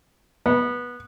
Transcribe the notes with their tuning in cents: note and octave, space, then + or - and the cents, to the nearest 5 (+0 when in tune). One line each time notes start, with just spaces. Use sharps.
B3 -15